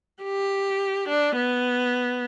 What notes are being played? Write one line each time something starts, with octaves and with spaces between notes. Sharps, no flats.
G4
D4
B3